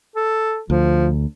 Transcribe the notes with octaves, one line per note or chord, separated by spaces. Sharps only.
A4
D2 F3